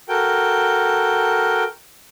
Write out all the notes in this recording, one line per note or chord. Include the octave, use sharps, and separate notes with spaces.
F#4 A4 A#4 G5